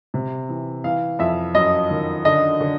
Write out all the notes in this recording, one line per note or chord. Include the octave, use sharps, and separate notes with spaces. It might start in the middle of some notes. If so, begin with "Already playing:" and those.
C3
E3
E3 F5
F2 E5
F#2 D#5
D#3
D3 D#5
D3